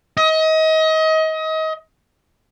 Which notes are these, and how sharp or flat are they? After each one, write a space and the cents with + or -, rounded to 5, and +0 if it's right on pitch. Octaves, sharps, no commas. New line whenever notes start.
D#5 +30